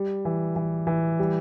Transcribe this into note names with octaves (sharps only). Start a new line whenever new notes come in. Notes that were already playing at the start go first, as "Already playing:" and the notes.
Already playing: G3
E3
E3
E3
G3